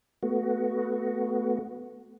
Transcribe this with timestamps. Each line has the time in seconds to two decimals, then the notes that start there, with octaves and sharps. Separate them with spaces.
0.23 A3 B3 F#4